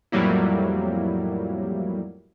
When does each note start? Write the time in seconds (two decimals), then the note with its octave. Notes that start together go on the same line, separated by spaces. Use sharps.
0.12 F2 A2 F#3 G3 A#3 E4